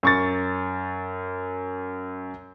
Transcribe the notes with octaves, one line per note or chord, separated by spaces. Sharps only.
F#2 C#6 A6